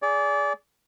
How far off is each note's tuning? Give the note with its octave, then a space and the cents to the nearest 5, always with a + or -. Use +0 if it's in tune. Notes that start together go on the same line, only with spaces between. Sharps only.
G#4 +0 D5 -25